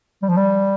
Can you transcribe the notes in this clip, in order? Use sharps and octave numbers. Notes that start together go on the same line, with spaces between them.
G3
F3
G3